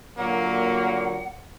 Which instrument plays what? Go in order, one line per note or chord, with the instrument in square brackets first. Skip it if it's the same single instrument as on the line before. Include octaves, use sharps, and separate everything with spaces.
[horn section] A#2 D3 F#3 [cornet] A#3 [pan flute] F#5